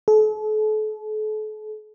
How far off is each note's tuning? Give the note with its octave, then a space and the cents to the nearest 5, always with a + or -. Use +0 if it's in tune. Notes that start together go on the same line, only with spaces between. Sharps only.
A4 -40